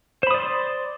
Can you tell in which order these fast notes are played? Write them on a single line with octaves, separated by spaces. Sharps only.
C5 B5 D#6 D5 C6